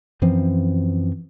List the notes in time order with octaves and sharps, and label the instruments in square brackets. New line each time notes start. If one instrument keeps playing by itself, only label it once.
[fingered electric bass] F#2 E3 F3 C4